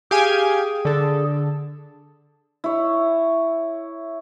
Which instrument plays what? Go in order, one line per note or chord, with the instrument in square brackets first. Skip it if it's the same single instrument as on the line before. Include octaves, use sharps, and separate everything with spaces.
[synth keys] G4 F5 G#5 [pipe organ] G#4
[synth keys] D3 A4
[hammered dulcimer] E4 C#5